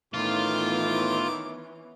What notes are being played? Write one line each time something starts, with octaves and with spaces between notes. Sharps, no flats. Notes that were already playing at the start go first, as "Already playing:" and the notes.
A2 D#3 E3 B3 C#4 F4 D6